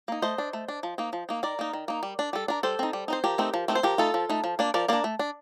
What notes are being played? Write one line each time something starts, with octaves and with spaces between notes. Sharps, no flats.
A#3 D#4
A3 C5 D#5
D4
A3
D4
F3
A#3 D#4
F3
A#3 D#4
D#3 A#4 D5
A#3 D#4
D#3
A#3 D#4
G3
D4
G3 A4
D4 A#4
G3 A4 C5
C4 D#4
G3
C4 D#4 C5
F3 G4 A#4
A3 C4 D#4
F3
A3 C4 D#4
C5
F3 G4 A#4
A3 D#4 F4 A4
F3
A3 D#4
F3
A#3 D4
F3 A#4 D5
A#3 D4 A#4 D5
A3
D4